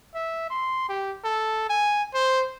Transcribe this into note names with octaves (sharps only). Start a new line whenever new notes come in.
E5
C6
G4
A4
G#5
C5